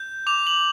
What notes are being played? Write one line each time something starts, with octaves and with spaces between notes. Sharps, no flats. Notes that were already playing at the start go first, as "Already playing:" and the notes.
Already playing: G6
D6 F7
F#7